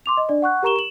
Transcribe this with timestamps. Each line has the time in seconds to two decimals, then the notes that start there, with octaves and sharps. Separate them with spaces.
0.06 C6 D6 F7
0.17 D#5
0.29 D4 D5
0.42 F#5 C#6 F#6
0.63 G4 A#4 A#5 C#6 E7 G7
0.76 E7 F#7